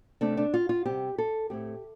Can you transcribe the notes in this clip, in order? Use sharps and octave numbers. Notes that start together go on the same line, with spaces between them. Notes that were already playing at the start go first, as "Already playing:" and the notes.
C3 A3 C4 D4
D4
F4
F4
C3 G3 C4 G4
A4
A2 A3 C4 G4